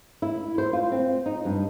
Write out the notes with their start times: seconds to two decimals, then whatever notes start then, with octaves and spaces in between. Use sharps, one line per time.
0.22 E4
0.58 C5
0.73 F4
0.92 C4
1.26 D#4
1.45 G2